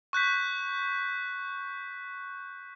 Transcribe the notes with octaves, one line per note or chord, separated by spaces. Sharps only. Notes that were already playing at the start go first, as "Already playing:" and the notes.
C#6 F#6 G6 B6